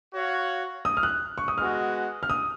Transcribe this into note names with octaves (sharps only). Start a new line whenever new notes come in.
F#4 C#5 F5
D#6
F6
F#6
C#6
D#6
G#3 B3 F#4 F6
F6
D#6